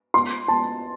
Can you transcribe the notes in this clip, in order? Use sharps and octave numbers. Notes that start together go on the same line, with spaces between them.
C6
A5